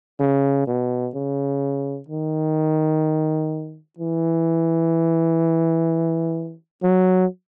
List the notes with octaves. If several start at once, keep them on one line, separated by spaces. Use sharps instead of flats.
C#3
B2
C#3
D#3
E3
F#3